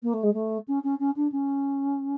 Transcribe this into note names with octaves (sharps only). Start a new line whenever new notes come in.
A#3
A3
G#3
A3
C#4
C#4
C#4
D4
C#4